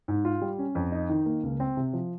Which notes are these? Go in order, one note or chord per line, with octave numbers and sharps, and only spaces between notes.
G#2
F4
G3
C#4
F2
D#4
D#3
A#3
C#2
C4
C3
F3